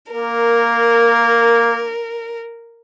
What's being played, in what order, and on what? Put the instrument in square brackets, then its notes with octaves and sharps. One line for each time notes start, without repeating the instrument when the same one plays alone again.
[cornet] A#3 [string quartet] A#4